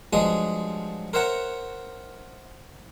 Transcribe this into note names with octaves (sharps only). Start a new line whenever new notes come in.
G2 F3 F#3 G#3 D#5 D#6
A#4 C5 C#5 E5 F#5 A#5